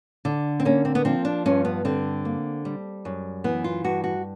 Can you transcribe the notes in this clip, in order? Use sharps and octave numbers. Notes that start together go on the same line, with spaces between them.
D3
C4
A#3 C#4
C4
B3
F3 C4
D4
G2 C#4
B3
D3 C4
A#3
G3
F#2
E3 B3
F4
G2 F#4
F#4